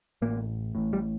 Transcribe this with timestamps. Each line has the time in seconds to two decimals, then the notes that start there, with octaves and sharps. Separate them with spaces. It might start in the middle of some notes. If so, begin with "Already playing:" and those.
0.22 A1 A2 A#3
0.75 A1 A2
0.93 G3